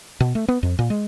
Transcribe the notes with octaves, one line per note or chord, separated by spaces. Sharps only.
B2
A3
B3
F2
A#2
G#3